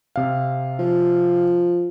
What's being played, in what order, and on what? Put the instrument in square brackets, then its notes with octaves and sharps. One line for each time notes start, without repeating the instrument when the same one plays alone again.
[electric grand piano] C3 F5
[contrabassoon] F3